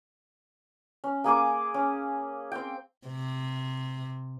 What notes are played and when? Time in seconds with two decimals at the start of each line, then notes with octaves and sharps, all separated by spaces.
1.04 C#4
1.24 A#3 G#4 G#5 D6
1.74 C#4
2.52 C4 G5
3.08 C3